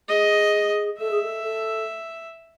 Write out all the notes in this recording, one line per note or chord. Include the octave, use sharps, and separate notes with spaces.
G#4 D#5
A4 E5
G#4
A4
A4